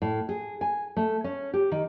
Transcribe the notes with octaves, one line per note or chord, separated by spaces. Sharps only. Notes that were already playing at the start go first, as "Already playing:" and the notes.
A2
G#4
G#5
A3
C#4
G4
D#3